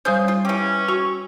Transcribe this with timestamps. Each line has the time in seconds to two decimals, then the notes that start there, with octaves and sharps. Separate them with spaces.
0.05 G3 C#4 G#4 C5 D#6 G6
0.28 F4
0.45 E3 C#4 G4
0.88 F#4 C#6